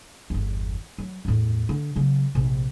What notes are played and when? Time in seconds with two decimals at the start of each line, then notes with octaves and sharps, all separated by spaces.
0.30 G1 E2
0.98 F#3
1.25 E2 A2
1.69 D3
1.96 C#3 F#3
2.35 A#1 C3